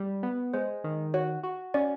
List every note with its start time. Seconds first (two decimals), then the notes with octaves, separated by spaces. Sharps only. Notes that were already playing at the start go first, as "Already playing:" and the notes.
Already playing: G3
0.23 B3
0.54 G#3 C5
0.84 D#3
1.14 F#4 C#5
1.43 F#4
1.74 C#4 D5